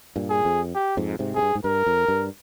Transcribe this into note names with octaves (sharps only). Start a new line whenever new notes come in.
G2 A#2
G#4
F2
G4
F2 G#2
G#2 C3
G#2 G#4
G2
G#2
G2 A#4
F2
G2